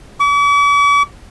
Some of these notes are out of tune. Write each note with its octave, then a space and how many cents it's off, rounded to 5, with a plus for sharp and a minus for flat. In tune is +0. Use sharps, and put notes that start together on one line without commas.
D6 -45